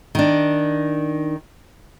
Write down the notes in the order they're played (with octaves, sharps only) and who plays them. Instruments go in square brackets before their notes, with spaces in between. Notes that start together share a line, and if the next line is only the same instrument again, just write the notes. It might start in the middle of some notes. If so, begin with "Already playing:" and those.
[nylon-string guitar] D#3 D4